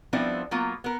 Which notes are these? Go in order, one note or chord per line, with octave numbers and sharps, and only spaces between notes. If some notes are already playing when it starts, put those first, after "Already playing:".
F3 G3 B3 C4 D4 E4
F#3 A#3 B3 F4
B3 A#4